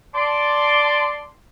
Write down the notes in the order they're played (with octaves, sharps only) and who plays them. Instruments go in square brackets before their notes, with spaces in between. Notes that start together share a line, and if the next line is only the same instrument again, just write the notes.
[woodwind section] D5 A5 C6 D6